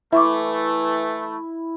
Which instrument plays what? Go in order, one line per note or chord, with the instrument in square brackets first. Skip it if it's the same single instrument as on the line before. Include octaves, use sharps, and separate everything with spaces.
[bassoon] E3 [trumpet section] A3 [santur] E4 [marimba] E5 C#6 D6